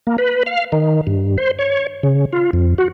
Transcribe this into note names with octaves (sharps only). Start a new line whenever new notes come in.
A#3
B4
F5
D#3
G2
C5
C#5
C#3
F4
F2
F#4